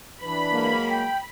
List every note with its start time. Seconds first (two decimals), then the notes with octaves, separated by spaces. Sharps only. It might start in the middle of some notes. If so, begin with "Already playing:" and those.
0.22 E3 D4 B4 B5
0.52 F#3 G#3 A#3
0.91 G5